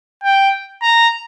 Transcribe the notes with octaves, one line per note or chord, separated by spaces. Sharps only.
G5
A#5